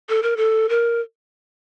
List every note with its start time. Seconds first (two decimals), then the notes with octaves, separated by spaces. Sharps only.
0.09 A4
0.23 A#4
0.37 A4
0.69 A#4